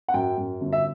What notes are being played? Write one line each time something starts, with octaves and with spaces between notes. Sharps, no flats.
F#5
F#2 G5
F#2
G1
E5